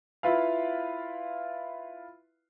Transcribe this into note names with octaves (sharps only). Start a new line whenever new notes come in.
E4 F4 B4 F5